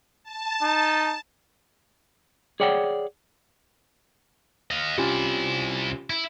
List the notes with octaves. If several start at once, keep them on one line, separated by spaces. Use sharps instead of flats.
A5
D#4
G#4 C#5 D5 F#5 G5
D#5 F5
C2 C#4 E4 F4 G4
E4